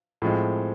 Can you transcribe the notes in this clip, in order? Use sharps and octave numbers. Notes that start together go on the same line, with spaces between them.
A2 F3 G#3 C4